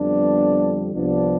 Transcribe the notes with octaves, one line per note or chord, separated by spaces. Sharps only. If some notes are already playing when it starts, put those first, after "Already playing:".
Already playing: F2 D3 G3 B3 D4
C2 C3 F3 B3 D4